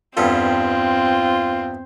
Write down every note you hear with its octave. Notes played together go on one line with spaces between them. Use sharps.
E2 G2 C4 F4 A4